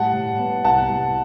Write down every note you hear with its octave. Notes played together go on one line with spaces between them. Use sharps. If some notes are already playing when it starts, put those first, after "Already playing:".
Already playing: A2 G3 F#5 A5
A2
B3
C2 F#5 A5
C2